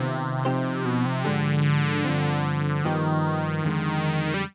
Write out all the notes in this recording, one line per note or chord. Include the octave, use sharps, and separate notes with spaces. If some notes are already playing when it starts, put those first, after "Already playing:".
Already playing: C3 D#3 B3 F4
F3 C4 D#4 G4 C5
B2
C3
G#2 D3 F3 G#3 D4 G4
G2 F3 C4
G2 D#3 F3 B3 D#4 G4
F2 D3 G#3
G3